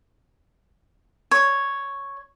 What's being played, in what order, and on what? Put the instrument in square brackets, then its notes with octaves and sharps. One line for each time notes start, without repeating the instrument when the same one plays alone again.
[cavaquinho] C#5